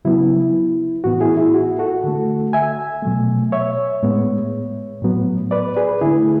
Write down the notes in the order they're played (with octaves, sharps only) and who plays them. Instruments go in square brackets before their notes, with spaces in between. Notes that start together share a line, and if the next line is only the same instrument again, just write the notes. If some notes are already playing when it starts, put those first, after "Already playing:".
[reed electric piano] C#3 F#3 B3 E4
A2 E3 B3 F#4
E4 G#4
E4
F#4
F#4 A4
D3 A3
E5 G#5
B2 F#3 A3
C#5 E5
A2 G#3 B3
A2 F#3 B3
B4 D5
G#4 B4
D3 A3 E4 G#4